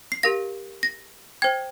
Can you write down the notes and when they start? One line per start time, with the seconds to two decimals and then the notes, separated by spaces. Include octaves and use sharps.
0.12 C7
0.23 G4 A#4 F5 A#6
0.83 A#6
1.42 C5 G5 G#6